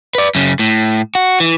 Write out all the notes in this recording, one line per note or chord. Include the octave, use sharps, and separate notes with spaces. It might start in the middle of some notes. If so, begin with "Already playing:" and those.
B4 D5
F#2 C#3
A2
F#4
E3